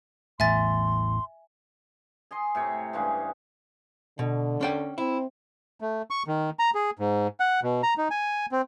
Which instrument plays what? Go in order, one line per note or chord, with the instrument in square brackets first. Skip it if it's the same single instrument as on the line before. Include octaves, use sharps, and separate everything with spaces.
[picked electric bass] A1 E2 A2 [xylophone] E5 G#5 A6 [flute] C6
[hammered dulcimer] G#4 D#5 C6
A2 C3 C#5
G2 C#3 E3 G#3
[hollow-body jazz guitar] B2 [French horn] D3
[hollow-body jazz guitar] C#4 D5 G5
[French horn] C4 [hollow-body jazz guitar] E4
[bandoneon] A3
C#6
D#3
A#5
G#4
G#2
F#5
B2
A#5
D#4
G#5
C4